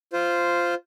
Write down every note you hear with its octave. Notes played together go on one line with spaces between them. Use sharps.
F4 C5